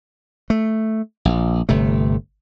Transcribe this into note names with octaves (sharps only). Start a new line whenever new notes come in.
A3
A#1
G1 C3 A3